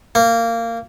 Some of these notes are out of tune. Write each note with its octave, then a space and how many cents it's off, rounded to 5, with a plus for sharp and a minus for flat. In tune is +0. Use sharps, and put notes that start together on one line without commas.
A#3 -20